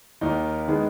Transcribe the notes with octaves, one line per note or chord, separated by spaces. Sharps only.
D#2 D#3 A#3 D#4
D#3 G#3 B3